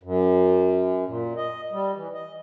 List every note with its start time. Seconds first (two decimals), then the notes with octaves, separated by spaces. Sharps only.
0.03 F#2
1.06 A#2
1.37 D#5
1.72 G3
1.96 E3
2.14 D#5